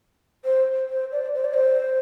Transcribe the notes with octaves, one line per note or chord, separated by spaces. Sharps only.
C5
C5
D5
C5
D5
C5